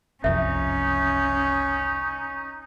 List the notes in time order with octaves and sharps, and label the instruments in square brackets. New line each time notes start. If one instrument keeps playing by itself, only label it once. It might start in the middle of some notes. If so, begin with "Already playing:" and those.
[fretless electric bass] F#1 C2 F2 [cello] C#4 [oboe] D#4 [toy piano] E5